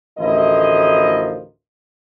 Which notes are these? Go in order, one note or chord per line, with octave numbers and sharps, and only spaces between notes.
A1 D2 F3 E4 A#4 D#5